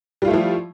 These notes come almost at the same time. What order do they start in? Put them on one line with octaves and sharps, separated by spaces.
G3 F4 A3 E4 F3